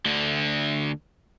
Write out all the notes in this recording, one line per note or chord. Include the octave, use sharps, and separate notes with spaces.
D2 D3